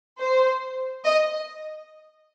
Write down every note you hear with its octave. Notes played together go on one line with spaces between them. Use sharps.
C5
D#5